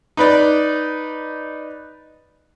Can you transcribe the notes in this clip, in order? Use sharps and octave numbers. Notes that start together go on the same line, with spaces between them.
D#4 B4 D5